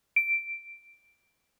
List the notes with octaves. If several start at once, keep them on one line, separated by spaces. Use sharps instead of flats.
D7